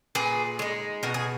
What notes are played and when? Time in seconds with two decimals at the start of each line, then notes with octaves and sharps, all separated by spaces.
0.15 A#2 G#4 B4
0.59 G#3 D#4
1.03 B2 F#4 A#4
1.14 G#4